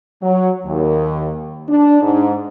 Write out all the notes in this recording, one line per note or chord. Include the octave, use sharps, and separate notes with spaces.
F#3
D#2
D4
G#2